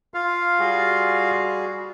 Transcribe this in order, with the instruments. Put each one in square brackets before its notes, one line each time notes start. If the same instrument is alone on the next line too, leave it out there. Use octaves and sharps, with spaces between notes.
[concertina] F4 F5
[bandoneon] G3 F#4 G#4